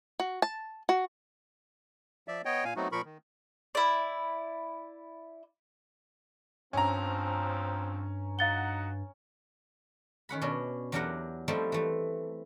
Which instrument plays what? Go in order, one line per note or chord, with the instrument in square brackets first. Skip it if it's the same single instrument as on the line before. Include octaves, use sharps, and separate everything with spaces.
[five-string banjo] F#4
A5
F#4
[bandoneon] F3 D5 E5
B3 C#5 D#5 G5
A#2 F5 G#5
F#3 A3 B3 C4 D#4 F#4
A#2 F3 A#4 B5 C#6
D#3
[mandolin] E4 D5
[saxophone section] D2 F3 C4 [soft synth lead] G2 [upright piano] C#4 A#5
[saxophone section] F#3 D#4 F#5 [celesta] F5 A6 G7
[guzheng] D#3 C#4 F#5 B5
B2 C#4 D4
E2 F#3 D4 G4 A#4 F#5
F3 G3 A3 C4 D#4 E4
E3 A3